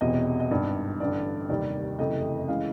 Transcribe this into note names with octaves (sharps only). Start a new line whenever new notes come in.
E1 E2 C3 D#5
D#5
G#1 G2 D#3 D5
A1 G2 D3 D5
F1 D#2 D#3 G3 D5
F#1 F2 C3 E3 A3 D#5
C#3 E3 G#3 F5